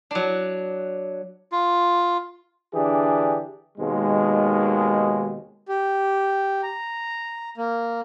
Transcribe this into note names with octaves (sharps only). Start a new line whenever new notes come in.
F#3 D4
F4
D3 E3 D4 G4 G#4
D#2 B2 D#3 G#3
G4
A#5
A#3